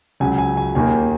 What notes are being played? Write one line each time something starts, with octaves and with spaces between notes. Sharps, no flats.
C#2 C#3 F#3 G#5
G#5
G#5
D#2 D#3 A#3 G#5